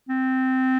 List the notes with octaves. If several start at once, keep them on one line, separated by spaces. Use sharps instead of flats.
C4